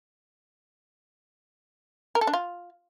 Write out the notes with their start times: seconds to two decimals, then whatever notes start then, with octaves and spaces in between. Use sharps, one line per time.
2.15 A#4
2.21 A4
2.27 D4
2.33 F4